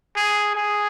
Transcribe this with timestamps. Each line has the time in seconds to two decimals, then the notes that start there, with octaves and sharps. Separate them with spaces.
0.16 G#4
0.56 G#4